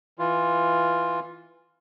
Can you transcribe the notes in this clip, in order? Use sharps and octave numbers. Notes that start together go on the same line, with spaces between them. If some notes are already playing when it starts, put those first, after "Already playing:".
E3 F4